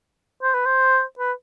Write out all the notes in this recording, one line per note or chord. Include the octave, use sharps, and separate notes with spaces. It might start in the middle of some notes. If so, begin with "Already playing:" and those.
C5
B4
C5
B4